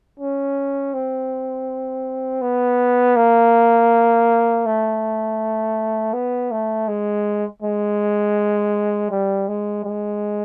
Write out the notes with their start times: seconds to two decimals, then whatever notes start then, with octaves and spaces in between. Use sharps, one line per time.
0.20 C#4
0.94 C4
2.42 B3
3.16 A#3
4.66 A3
6.13 B3
6.51 A3
6.88 G#3
7.62 G#3
9.11 G3
9.48 G#3
9.85 G#3